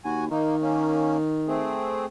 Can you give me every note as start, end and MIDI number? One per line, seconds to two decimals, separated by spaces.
0.05 0.27 39
0.05 0.24 66
0.05 0.24 80
0.31 1.79 51
0.31 0.56 58
0.31 0.56 63
0.62 1.17 58
0.62 1.17 61
1.48 2.05 57
1.48 2.05 60
1.48 2.05 68